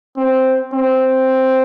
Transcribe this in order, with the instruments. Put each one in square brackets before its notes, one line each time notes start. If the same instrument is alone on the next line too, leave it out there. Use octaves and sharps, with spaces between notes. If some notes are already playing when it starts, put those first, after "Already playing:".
[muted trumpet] C4
C4